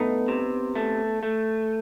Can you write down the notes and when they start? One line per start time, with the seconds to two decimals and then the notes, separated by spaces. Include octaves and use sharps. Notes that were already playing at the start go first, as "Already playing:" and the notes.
Already playing: A3 B3 D#4
0.28 C3
0.75 A3
1.23 A3